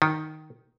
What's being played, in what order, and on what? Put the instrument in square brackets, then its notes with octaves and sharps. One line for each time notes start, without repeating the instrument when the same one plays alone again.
[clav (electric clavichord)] D#3